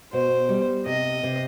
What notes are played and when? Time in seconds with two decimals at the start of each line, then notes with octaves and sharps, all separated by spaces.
0.12 B2 C5
0.49 G3
0.86 C3 D#5
1.23 C3